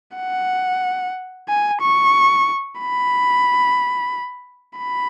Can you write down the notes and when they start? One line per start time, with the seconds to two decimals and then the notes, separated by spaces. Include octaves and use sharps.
0.17 F#5
1.49 G#5
1.81 C#6
2.80 B5
4.79 B5